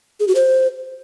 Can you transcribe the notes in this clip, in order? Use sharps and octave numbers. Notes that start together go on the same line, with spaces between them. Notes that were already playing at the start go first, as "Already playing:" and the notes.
G#4
F#4
C5